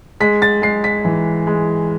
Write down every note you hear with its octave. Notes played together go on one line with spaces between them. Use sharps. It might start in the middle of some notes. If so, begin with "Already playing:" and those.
G#3 B6
A6
G#3 C7
B6
E3
G#3